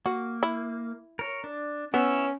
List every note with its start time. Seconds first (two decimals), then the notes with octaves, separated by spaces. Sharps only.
0.06 A#3 F#4
0.43 E4
1.19 A#4 C#5
1.44 D4
1.94 B3 C#4 E4 C#5 E5